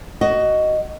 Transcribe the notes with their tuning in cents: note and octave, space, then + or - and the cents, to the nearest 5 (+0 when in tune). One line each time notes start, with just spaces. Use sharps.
F#4 +15 D#5 +0